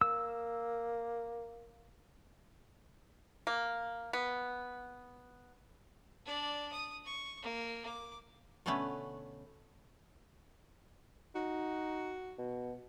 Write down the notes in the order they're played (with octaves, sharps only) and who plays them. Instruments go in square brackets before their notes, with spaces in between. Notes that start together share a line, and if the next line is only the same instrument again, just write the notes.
[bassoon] A#3 [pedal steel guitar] E6
[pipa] A#3
B3
[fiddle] D4 D5
D#6
C#6
A#3
D6
[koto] B2 D3 A3 B3 C#4 B4
[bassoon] D#4 [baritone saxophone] F#4
[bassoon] B2